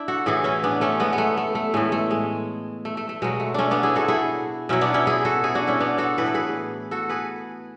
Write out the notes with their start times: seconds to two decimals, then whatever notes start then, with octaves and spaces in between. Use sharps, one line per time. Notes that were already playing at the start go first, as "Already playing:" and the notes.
Already playing: D4 E4
0.08 F#4 A4
0.26 A2 E3 E4 G#4
0.44 C#4 E4
0.64 B3 D4
0.81 A3 C#4
1.00 G#3 B3
1.13 B3
1.18 A3
1.37 A3
1.55 A3
1.74 A2 E3 G#3
1.92 A3
2.11 G#3
2.85 A3
2.97 A3
3.09 A3
3.22 B2 F#3 G#3
3.40 A3
3.54 A3 C#4 D4
3.71 B3 D4
3.83 E4 G#4
3.95 F#4 A4
4.08 E4 G#4
4.69 B2 F#3 C#4 E4
4.81 B3 D4
4.94 C#4 E4
5.07 E4 G#4
5.25 F#4 A4
5.44 E4 G#4
5.55 D4 F#4
5.67 C#4 E4
5.80 B3 D4
5.98 F#4 A4
6.18 A2 E3 B4
6.26 A4
6.34 G#4 B4
6.91 F#4 A4
7.09 G#4 B4